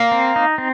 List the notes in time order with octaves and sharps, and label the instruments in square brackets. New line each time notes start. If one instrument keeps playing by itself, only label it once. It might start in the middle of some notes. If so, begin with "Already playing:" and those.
Already playing: [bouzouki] A#3
[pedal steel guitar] C4
D#4
C4